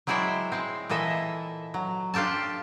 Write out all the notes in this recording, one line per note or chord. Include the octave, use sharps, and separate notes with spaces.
F#3 G#3 E4 C5 D5 G5
G#3 C4
A#2 E3 A4 D#5 E5
F#3
D4 F4 G4 A4 A5